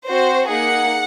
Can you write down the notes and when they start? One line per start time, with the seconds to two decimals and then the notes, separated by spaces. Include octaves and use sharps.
0.09 C4 F#4 C5
0.48 A#3 D#4 G#4 F#5